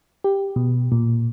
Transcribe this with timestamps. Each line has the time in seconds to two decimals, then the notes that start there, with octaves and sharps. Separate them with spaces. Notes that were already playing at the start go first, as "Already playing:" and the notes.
0.24 G4
0.56 B2
0.92 A#2